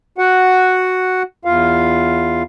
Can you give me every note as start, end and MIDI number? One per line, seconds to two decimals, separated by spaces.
0.18 1.23 66
0.18 1.23 78
1.45 2.43 40
1.45 2.43 65
1.45 2.43 77